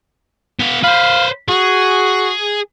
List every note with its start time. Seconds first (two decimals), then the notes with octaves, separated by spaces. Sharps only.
0.60 B3 F5
0.83 B4 C5 F5
1.48 F#4 G#4